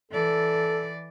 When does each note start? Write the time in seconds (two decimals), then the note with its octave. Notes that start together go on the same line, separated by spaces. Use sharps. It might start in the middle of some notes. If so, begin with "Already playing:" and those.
0.11 E3 A4 D5